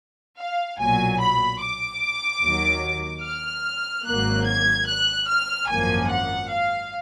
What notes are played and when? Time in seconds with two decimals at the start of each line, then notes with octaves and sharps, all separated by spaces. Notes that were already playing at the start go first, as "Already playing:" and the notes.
0.38 F5
0.79 B1 A#2 F#3 G#5
1.20 B5
1.60 D6
2.43 D#2 D#3 F#3
3.24 F6
4.05 G#1 G#2 F#3 A#3 F#6
4.47 G#6
4.88 F#6
5.28 F6
5.69 G#1 F#2 F3 A#3 G#5
6.10 F#5
6.51 F5